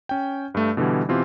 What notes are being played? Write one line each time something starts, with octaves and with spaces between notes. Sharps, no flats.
C#4 G5
G2 A3
B2 D3 E3 G3
B2 E3 C4 F4 G4